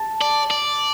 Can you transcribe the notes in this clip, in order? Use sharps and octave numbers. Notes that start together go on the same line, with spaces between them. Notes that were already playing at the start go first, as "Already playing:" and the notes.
Already playing: A5
D5
D5